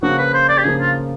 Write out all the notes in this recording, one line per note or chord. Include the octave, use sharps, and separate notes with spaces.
C#3 F3 A#3 F#4
B4
C5
D5
G4
C#3 F3 A#3 G#4
F4